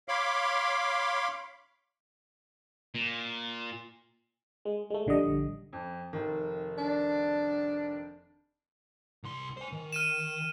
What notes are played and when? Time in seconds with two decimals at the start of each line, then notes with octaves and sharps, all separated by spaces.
0.08 C#5 F5 B5 C6 D6
2.95 A#2
4.65 G#3
4.90 G#3 A3
5.07 A#1 D3 G3 D#5
5.73 F2
6.13 F1 D#3
6.78 D4
9.23 C2 C6
9.57 C5 G#5
9.72 D#3
9.93 F6 D#7 E7